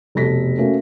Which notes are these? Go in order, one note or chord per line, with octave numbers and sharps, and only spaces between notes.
F1 B2 A4 A#6 B6
A3 A#3 C#4 F#4